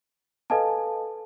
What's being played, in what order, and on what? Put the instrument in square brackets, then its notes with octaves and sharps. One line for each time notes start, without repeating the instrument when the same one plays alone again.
[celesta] A4 B4 D#5 F5 G#5 A5